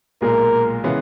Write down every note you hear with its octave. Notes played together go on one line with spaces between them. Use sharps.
B1 A#2 G#3 A#4
C#3 E3 G#3 B3